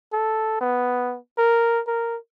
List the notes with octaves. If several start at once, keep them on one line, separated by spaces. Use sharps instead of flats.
A4
B3
A#4
A#4